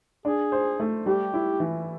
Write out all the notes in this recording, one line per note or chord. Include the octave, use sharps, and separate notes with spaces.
D4 G#4
C5
A3
G3 G4
E4
E3